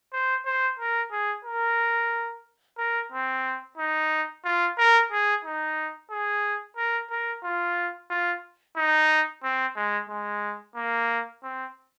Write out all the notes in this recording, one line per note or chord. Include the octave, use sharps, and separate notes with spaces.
C5
C5
A#4
G#4
A#4
A#4
C4
D#4
F4
A#4
G#4
D#4
G#4
A#4
A#4
F4
F4
D#4
C4
G#3
G#3
A#3
C4